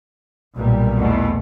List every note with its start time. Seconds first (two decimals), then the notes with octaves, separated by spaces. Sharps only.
0.56 B1 A#2 G3
0.98 E2 B2 A3